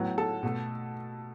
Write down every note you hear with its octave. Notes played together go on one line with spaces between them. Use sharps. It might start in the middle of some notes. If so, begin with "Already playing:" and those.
Already playing: A2 F#3 B3
A4
B2 A3